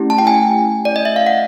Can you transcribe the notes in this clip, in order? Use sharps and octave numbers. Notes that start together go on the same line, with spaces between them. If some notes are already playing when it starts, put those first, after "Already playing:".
Already playing: A3 C#4 E4 G4
A5
G5
G#5
D5
D#5
E5
F5
F#5